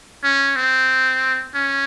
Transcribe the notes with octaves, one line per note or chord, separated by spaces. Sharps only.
C#4
C4
C#4